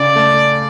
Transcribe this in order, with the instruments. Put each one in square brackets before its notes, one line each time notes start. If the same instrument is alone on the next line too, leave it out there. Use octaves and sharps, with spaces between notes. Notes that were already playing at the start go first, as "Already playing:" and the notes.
Already playing: [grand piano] C#3 [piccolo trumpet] D5
[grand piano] A3